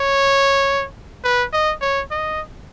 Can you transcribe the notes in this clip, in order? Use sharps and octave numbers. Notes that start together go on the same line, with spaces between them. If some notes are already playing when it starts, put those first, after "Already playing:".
Already playing: C#5
B4
D#5
C#5
D#5